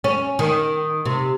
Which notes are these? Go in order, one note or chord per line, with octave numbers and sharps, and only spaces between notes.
C#4
D#3
C3